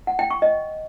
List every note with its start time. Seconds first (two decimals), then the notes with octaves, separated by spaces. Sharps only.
0.07 F#5
0.19 G5
0.31 C#6
0.42 D#5